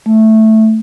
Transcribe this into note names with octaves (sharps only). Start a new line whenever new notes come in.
A3